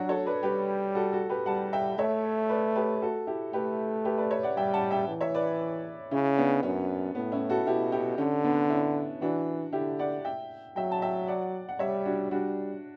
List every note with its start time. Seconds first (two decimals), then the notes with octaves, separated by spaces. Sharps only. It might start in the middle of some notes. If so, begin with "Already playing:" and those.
Already playing: F#3 D4 F#4
0.09 A4 C#5
0.26 B4 D5
0.43 G3 G4 B4
0.95 F#4 A4
1.12 F#4 A4
1.29 G4 B4
1.46 G3 F#5 A5
1.73 E5 G5
1.98 A3 C#5 E5
2.49 B4 D5
2.76 G4 B4
3.02 F#4 A4
3.27 E4 G4
3.53 A3 G4 B4
4.05 G4 B4
4.18 B4 D5
4.31 C#5 E5
4.43 D5 F#5
4.57 G3 E5 G5
4.74 F#5 A5
4.91 E5 G5
5.08 E3
5.21 C#5 E5
5.34 B4 D5
6.11 C#3 C#4 E4
6.37 B3 D4
6.63 F#2 C#4
7.14 A2 B3
7.32 C#4 E4
7.49 F#4 A4
7.67 B2 E4 G4
7.92 E4 G4
8.18 D3 C#4
8.44 B3 D4
8.69 C#4 E4
9.21 E3 D4 F#4
9.73 D3 E4 G4
9.99 D5 F#5
10.25 E5 G5
10.76 F#3 E5 G5
10.92 A5
11.02 E5 G5
11.28 D5 F#5
11.69 F#5
11.79 G3 C#5 E5
12.05 D4 F#4
12.31 G3 D4 F#4